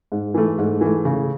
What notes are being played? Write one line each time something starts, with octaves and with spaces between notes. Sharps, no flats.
G#2
E3 A3
G#2
E3 A3
C#3